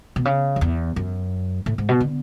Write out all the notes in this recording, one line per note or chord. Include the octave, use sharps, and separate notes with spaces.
B2
C#3
F#2
E2
F#2
A2
G#2
B2
D3